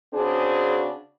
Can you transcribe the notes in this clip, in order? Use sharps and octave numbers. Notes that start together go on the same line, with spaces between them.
C#3 C4 D4 F#4 G#4